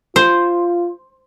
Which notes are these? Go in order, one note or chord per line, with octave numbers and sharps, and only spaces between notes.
F4 C5